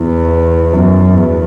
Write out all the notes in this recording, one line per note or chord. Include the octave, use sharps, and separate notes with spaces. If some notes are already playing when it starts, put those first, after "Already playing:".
Already playing: E2
F#2
E2